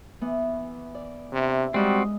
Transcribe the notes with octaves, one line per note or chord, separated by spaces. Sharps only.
E3 B3
D5
C3 D4 E4
G3 G#3 C4 F#4 D#5